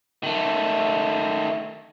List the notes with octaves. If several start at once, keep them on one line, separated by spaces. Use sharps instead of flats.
D#3 A3